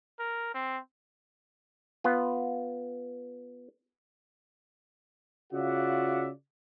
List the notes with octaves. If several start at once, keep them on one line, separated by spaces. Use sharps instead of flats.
A#4
C4
B3 F4
C#3 F4 F#4 D5 E5 F#5